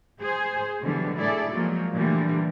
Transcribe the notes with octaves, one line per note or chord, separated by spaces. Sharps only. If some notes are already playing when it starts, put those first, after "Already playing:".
G#4 C5
B2 D3 E3 F#3 G3
A2 E4 G#4 A4 D5
F3 F#3 G#3 A#3
A#2 D3 E3 G3 A3